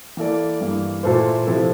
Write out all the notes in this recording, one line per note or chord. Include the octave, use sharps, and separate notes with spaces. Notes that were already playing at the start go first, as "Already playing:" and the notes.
E3 A#3 E4 A4 D5
G2 E3 A#3
A#2 A3 E4 A4 C5
C3 F3 C4 E4 A4